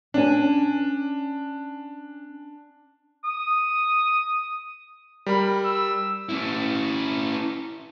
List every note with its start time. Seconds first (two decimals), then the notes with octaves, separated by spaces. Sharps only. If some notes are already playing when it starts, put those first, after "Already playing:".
0.14 C#4 D4 G#5
3.25 D#6
5.26 G3 A#4 B5
5.64 E6
6.29 C#4 E4